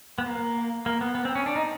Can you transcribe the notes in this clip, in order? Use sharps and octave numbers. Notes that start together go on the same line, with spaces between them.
B3
A#3
A#3
B3
B3
C4
C#4
D4
D#4